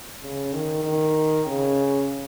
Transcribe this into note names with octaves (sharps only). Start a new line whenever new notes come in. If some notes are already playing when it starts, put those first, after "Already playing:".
C#3
D#3
D#3
C#3